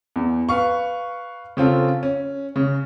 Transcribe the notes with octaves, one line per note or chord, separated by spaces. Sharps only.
E2
B4 F5 C#6
C#3 C4 F4 A4
C#4
C#3